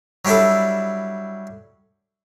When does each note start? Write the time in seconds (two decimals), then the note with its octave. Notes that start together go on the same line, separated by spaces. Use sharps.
0.25 F#3 G3 D4 E4 A4